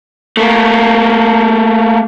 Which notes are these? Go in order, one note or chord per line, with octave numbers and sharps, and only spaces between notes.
A3 A#3